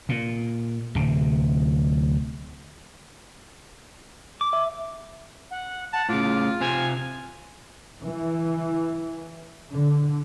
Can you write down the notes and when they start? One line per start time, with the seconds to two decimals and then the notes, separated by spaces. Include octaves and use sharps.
0.09 A#2
0.95 D1 C3
4.41 D6
4.53 E5
5.51 F#5
5.93 F#5 A5
6.09 A2 C#3 F4 D6
6.61 C3 C5 F5 G#5
8.02 E3
9.72 D3